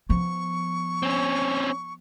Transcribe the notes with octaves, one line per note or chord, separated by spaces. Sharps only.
F3 B3 C#6
C4 C#4